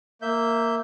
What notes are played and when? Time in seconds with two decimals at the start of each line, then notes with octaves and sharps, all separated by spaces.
0.22 A#3 E5 G6